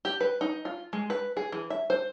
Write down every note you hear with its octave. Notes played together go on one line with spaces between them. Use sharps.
G4
B4
D#4
F4
G#3
B4
G#4
E3
E5
C5